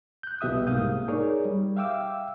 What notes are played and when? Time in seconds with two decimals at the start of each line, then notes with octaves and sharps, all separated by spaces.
0.23 F#6 G6
0.41 C2 B2 G4 E5 D#6
0.67 C2 G#2 A#3 F5 D#6 G6
1.08 D#4 G#4 A#4 C#5 D5
1.45 G3
1.76 E5 F5 G5 D6 E6